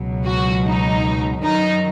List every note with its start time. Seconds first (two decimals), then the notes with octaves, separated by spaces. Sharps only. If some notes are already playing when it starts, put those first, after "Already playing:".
Already playing: C#2 B2 F#3
0.25 F#4
0.65 D#4
1.43 F#2 D#3 F#3 D#4